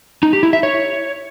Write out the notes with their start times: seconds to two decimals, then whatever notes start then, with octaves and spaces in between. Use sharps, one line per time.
0.23 D#4
0.33 G4
0.43 E4
0.53 E5
0.63 C#5